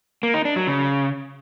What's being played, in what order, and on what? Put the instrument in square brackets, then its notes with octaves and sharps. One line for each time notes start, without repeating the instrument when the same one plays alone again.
[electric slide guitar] A#3
D#4
D4
F#3
C#3